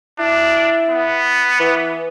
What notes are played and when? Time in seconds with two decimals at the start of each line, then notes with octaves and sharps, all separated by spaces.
0.19 D4 E4
0.90 B3
1.59 E3